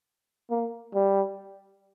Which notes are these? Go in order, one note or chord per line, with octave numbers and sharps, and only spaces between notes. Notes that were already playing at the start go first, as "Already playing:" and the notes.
A#3
G3